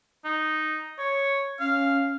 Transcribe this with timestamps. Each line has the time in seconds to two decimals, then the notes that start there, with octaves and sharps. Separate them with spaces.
0.25 D#4
0.99 C#5
1.60 C#4 F5